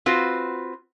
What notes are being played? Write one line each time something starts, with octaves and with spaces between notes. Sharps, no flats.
C4 F4 F#4 B4